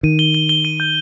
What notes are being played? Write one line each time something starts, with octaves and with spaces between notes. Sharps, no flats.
D#3 D#7
G7
G7
G7
D#7
G6